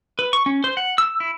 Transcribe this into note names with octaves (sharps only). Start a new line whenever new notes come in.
B4
C#6
C#4
C5
F#5
E6
E4